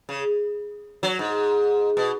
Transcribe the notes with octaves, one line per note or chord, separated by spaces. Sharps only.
C#3
F#3
G#2
B2